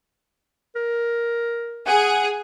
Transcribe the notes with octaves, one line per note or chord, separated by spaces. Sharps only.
A#4
G#4 F#5